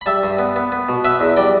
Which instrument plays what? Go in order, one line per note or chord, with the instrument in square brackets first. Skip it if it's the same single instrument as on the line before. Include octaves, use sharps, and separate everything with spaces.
[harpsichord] B5
G3 E5 A5
G2
B3
B3
B3
B2
B3 B4 E5
E2
G3 D5 G5